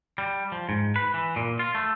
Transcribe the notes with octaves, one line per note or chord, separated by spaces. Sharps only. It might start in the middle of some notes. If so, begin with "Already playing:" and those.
G3
F3
G#2
B4
E3
A#2
F4
A3